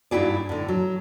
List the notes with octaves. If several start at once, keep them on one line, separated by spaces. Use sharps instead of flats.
G2 D#4 E4 F#4 G#4 D5
A2 D3
F#3